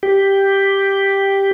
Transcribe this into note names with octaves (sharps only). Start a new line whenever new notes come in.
G4